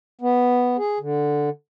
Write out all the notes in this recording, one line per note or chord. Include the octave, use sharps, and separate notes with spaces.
B3
G#4
D3